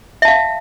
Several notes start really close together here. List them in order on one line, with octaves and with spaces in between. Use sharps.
E5 A5 F5